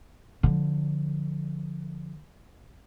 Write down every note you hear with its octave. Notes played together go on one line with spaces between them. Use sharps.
D3 F3